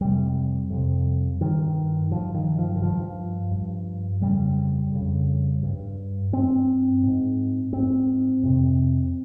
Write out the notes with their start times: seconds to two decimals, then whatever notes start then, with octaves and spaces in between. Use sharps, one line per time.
0.01 F2 C3 G3
0.70 F2 C3
1.41 G2 D#3
2.11 G2 F3
2.34 D#3
2.58 F3
2.76 D#3
2.82 G2 F3
3.51 G2
4.21 F2 C#3 G3
4.92 F2 C#3
5.63 G2
6.32 G2 C4
7.03 G#2
7.73 G#2 C4
8.43 F2 C3